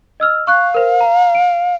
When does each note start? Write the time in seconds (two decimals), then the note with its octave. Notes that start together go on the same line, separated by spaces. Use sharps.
0.20 D#5 E6 F6
0.47 F5 C#6 F#6
0.74 A#4 C5
1.01 A#5
1.35 D7